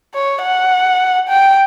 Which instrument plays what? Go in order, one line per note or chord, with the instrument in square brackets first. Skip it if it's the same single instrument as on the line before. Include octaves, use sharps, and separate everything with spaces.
[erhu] C#5
F#5
G5